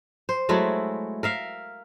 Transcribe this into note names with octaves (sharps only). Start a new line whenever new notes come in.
C5
F#3 G#3 A3 E4
A#4 E5 F5